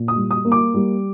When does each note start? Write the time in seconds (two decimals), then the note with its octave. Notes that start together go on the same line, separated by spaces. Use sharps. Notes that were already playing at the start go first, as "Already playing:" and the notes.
Already playing: A#2
0.08 D#6
0.16 G3
0.31 D#6
0.45 A#3
0.52 D6
0.74 G3